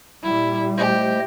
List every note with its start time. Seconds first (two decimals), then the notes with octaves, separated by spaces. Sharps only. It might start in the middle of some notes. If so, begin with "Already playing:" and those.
0.23 A#2 G3 E4
0.78 A3 G4 C5 D#5